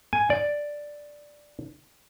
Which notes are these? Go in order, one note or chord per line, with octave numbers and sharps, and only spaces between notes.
G#5
D5